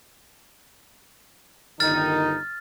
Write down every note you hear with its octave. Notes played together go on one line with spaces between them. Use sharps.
G1 D#3 D#4 F6 A6